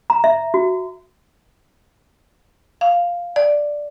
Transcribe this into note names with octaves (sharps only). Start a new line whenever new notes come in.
A#5
E5
F#4
F5
D5